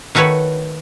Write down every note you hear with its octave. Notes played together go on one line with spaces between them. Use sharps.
D#3 A3 F#4 B4 C#5